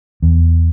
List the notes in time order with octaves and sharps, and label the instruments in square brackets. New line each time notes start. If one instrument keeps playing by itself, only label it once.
[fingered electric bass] E2